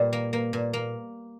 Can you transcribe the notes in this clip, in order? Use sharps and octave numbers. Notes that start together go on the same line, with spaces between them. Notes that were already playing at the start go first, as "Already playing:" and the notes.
Already playing: A#2 G3
A#3
A#3
A#2
A#3